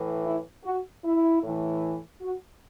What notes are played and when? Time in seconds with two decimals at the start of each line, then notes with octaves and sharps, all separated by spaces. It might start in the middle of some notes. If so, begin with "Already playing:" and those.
Already playing: A2 E3
0.24 E4
0.64 F#4
1.03 E4
1.42 A2 E3
2.21 F#4